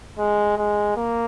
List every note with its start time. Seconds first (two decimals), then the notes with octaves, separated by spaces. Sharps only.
0.18 G#3
0.57 G#3
0.97 A#3